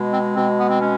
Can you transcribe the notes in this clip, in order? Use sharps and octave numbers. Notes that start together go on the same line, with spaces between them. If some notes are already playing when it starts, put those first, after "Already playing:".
Already playing: B2 G#3
C4
B2 C4
B3
C4
G#3 C#4